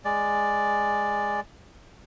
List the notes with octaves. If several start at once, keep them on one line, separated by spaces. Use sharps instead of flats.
G#3 D5